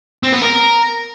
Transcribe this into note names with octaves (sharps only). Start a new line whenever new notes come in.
C4
B3
A#4